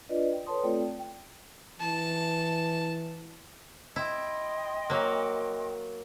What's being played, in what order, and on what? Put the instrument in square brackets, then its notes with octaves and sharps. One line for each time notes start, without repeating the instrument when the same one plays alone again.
[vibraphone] D4 F4 B4 D5 D#5
G5
A4 B4 C#5 A5 C6 D#6
A3 C4 F4 A4 D5 G5
G5
[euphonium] E3 [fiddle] A5
[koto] E4 [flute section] D#5 G5 C6
[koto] F#3 A#3